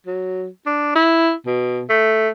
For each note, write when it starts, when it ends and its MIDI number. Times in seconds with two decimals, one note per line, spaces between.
0.07 0.47 54
0.66 0.92 62
0.95 1.32 64
1.47 1.82 47
1.90 2.29 57